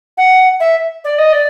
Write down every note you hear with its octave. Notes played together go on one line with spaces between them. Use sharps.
F#5
E5
D5
D#5
D5